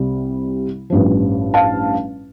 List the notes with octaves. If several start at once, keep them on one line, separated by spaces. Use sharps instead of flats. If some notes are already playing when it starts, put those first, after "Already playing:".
Already playing: C2 C3 G3
A1 G2 F3
F5 A5